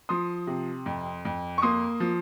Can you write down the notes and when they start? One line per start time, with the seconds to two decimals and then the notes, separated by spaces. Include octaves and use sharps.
0.09 F3 C6 D#6
0.47 C3
0.86 F2
1.25 F2
1.58 C#6
1.62 A#3 C6 D#6
2.00 F3